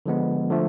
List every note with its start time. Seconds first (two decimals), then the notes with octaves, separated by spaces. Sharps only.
0.06 D3 F3 G#3 B3
0.50 D3 F3 A3